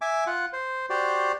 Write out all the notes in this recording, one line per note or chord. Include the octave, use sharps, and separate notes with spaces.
E5 G#5 D6
F4 F#5
C5
F#4 G4 C5 D5